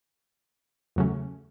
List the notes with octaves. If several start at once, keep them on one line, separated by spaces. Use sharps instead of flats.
E2 C#3 F#3 A3 C#4